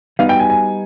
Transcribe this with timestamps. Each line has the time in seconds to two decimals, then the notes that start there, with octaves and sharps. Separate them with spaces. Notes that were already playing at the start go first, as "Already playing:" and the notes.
0.19 G3 B3 D#4 F5
0.29 G5
0.40 G#5
0.50 G#5